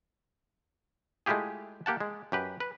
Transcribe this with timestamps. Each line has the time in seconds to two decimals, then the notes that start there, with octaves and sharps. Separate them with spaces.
1.26 G#3 A3 E4 F4 G4 G#4
1.86 A#3 G4 F#5 A5
2.00 G#3
2.32 F#2 G4 B4
2.60 B4